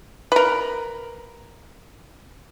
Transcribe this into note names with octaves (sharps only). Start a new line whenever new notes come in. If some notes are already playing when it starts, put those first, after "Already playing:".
A#4 B4